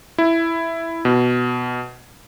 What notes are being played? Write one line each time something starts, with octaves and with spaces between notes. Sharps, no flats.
E4
B2